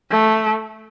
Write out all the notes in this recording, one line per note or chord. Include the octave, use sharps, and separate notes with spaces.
A3